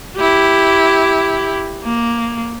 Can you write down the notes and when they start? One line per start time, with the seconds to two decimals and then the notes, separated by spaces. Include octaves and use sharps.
0.17 E4 G4
1.84 A#3